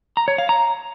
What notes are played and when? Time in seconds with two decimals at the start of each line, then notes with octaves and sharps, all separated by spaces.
0.17 A#5
0.28 C#5
0.38 F5
0.49 A#5